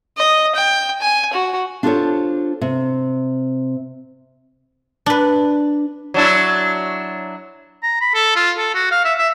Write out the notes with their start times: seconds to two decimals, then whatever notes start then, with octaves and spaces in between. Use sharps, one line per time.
0.18 D#5
0.55 G5
1.02 G#5
1.33 F#4
1.83 D4 F4 G4 A4 C5 C#5
2.61 C3
5.06 D4 B4
6.14 F#3 D4 E4
7.83 A#5
8.01 B5
8.15 A4
8.36 F4
8.58 A4
8.75 F#4
8.91 F5
9.05 E5
9.18 E5